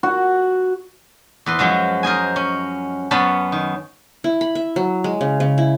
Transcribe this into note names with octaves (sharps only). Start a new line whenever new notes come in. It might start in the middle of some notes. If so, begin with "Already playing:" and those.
F#4
E2 B4 C6
F#2 F3 F#3 G#3
A#4 C5 D#5 G#5
C#4
F#2 B3 C#4 A5 B5
D#3
E4
B5
E5
F#3
G#3
C#3
C#3
E4